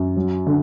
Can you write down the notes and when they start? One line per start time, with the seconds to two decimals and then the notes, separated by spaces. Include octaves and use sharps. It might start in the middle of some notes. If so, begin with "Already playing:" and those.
Already playing: F#2
0.17 F#3
0.46 D3